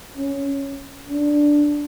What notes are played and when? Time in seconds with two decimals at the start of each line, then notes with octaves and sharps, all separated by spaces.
0.17 C#4
1.08 D4